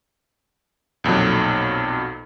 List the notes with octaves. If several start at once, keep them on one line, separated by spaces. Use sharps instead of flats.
B1 F2 A#2 F#3